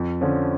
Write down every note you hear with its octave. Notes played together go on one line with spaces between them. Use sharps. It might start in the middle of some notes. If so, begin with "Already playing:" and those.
Already playing: F2
D3 F3 C#4